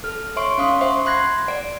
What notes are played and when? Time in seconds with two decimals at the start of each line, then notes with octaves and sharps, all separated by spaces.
0.04 A4 F6
0.36 C#5 E5 C6 C#6 D7
0.58 C#4 F5 C6 D#6
0.81 C5 E5 F#5 C6 C#6
1.05 B5 C6 F#6 G#6 A#6 C7
1.48 D5 F#5 D7